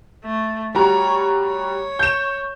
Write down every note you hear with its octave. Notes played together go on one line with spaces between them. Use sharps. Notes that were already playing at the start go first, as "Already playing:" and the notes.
A3
G3 F#4 C#5 A#5
C#5
G6 E7